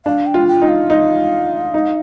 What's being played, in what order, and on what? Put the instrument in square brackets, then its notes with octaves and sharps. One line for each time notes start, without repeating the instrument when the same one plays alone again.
[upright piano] D4 [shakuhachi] F5
[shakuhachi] G5
[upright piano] F4
[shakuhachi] G5
[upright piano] D#4
[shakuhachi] F5
[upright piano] D#4
D#4